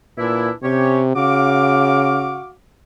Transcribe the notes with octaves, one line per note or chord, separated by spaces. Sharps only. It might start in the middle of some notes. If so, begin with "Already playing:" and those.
A#2 E3 D4 E4
C3 C#4 G4 C#5
C#3 F#4 F5 D6